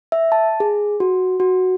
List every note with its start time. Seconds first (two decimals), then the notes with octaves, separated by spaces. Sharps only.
0.12 E5
0.32 A5
0.60 G#4
1.00 F#4
1.40 F#4